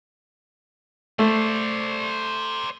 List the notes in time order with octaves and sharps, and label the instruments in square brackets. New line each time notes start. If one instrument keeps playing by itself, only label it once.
[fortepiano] A3 [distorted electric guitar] C5 D5